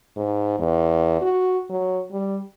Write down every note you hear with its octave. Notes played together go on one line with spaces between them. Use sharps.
G#2
E2
F#4
F#3
G3